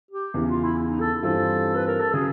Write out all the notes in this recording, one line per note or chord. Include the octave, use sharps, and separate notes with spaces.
G4
E2 C#3 E3
F4
E4
E4
D#4
A4
G2 E3 G3 C4 F4 A4
B4
A#4
A4
C#3 F#3 G#4